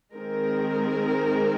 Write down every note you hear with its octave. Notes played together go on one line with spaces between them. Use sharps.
D#3 G#3 C4 A#4